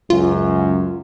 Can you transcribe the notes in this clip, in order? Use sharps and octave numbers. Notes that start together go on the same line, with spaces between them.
C#2 F#2 F4